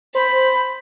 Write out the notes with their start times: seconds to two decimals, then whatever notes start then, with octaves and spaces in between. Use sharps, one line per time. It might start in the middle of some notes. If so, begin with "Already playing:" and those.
0.15 C5 B5